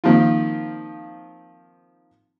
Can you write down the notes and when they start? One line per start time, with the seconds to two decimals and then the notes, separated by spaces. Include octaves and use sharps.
0.04 D#3 F3 A#3 C4 F4